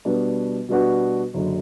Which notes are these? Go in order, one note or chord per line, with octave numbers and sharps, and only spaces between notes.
B2 G3 B3 D4 F#4
B2 G3 B3 D4 F#4
F#1 F#2 D3